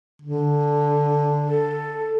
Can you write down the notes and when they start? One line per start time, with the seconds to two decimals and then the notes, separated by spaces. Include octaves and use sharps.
0.22 D3
1.49 A4